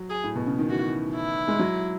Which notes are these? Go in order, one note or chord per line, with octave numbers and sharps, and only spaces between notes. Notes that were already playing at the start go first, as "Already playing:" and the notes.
Already playing: F#3
G#4
A2
B2
C#3
D#3
E3 F#4
E4
G#3
F#3